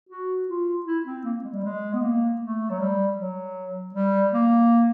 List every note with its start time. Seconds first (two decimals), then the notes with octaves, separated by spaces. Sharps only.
0.09 F#4
0.48 F4
0.86 E4
1.06 C4
1.24 A#3
1.44 G#3
1.53 G3
1.64 G#3
1.93 B3
2.01 A#3
2.41 A3
2.70 F#3
2.79 G3
3.17 F#3
3.94 G3
4.33 A#3